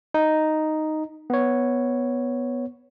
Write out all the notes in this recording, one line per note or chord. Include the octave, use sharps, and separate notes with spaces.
D#4
B3 C#5